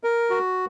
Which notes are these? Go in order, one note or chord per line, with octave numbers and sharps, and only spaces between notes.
A#4
F#4